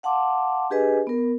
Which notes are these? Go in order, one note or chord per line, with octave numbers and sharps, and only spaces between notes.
F5 F#5 A5 C6 D6
D4 G4 G#4 B4 D#5 G#5
B3 A#4